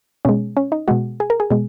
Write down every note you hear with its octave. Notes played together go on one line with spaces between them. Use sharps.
B2 G#3 C#4
C#4
D#4
B2 G#3 F#4
G#4
A#4
G#4
B2 G#3